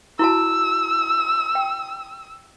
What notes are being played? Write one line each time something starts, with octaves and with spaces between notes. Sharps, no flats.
E4 F#4 A5 E6
G5